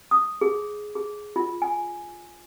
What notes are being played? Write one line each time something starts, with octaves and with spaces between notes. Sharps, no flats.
D#6
G#4
G#4
F4
G#5